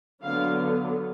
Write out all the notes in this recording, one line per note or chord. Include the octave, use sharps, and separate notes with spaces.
D3 F#3 B3 F5